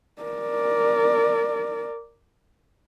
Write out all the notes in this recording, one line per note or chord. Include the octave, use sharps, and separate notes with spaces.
A#4 D5